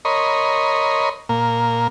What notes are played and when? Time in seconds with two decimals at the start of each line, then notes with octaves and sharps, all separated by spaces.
0.05 A#4 C#5 D#5 B5 C6
1.29 A#2 A#3